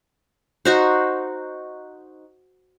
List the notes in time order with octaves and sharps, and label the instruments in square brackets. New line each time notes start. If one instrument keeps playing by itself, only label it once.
[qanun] D#4 F#4 C5